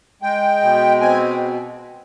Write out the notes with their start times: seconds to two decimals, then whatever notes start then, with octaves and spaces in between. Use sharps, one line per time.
0.22 G#3 G5
0.61 B2
1.00 C4 G#5